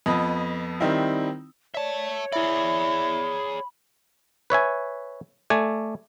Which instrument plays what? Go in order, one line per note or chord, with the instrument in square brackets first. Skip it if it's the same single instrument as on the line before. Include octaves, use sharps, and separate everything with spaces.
[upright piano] F2 B3 D#5 B5
D#3 G3 C4 D#4 E4
[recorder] C#5 [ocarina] D5 [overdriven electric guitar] E5 A5
[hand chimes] E4 E5 [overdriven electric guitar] G#4 D5 [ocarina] B5
[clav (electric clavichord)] B4 C#5 E5 G#5
A3 D5 G#5